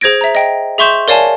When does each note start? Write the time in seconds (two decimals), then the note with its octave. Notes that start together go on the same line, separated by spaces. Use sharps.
0.01 G#4 C5 G#6 A#6 D7
0.21 E5 A#5
0.35 D#5 G5
0.78 G#4 E5 C6 C#6 G6 E7
1.08 A#4 C#5 D5 F5 G#5 A5